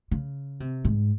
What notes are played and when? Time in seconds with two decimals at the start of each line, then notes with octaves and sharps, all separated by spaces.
0.11 C#3
0.60 C3
0.85 G#2